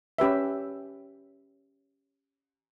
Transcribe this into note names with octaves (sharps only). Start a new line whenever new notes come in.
C#4 G4 B4 E5